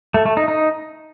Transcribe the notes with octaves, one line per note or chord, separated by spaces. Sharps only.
A3
A3
D#4
D#4